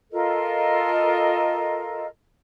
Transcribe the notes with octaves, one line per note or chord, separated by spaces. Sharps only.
F4 A4 A#4 D#5